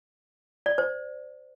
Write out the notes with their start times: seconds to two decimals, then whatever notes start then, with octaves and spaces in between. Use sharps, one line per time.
0.66 D5
0.78 C5